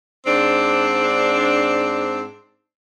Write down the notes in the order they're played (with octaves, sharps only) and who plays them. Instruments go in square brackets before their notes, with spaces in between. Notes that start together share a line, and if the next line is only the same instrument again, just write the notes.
[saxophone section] G#2 C4 D4